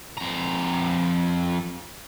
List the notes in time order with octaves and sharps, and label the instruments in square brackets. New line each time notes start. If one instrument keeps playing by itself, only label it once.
[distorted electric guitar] F2 A#5